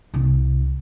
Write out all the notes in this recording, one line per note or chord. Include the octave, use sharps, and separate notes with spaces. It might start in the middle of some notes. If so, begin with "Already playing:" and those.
C2 C3